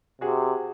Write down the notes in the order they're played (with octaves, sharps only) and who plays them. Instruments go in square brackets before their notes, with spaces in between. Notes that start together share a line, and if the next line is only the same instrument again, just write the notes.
[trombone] C3 [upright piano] F#4 G#4